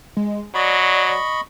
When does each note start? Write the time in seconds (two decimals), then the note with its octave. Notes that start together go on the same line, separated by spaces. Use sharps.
0.17 G#3
0.55 F#3 D5 D#5 B5 C#6